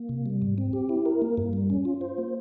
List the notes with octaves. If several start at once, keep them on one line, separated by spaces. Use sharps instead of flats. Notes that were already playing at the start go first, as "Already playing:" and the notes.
Already playing: A#3
C3
G3
G#2
C4
G4
E4
A#4
A#3
G2
G3
C#4
F4
C5
A#3